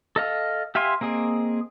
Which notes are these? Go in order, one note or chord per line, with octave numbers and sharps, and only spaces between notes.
A4 D#5 F5
G4 E5 F5 G#5 C6
A#3 C4 G#4 D#5